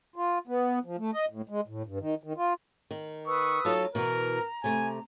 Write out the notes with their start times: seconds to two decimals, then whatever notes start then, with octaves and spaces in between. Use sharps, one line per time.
0.16 F4
0.47 B3
0.85 F3
0.98 A3
1.13 D#5
1.30 A2
1.49 G#3
1.68 A2
1.86 G2
2.00 D#3
2.23 D#3
2.36 F4
2.91 D#3
3.27 B4 C#6 D#6 E6
3.65 F#3 D#4 F4 A4
3.95 B2 E3 A#4 A#5
4.64 C3 A3 G#5